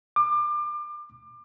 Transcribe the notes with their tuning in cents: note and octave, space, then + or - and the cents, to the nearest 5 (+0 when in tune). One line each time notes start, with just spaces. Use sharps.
D6 +30